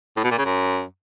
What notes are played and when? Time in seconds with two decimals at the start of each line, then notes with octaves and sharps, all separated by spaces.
0.17 A2
0.24 B2
0.31 A#2
0.38 C#3
0.45 F#2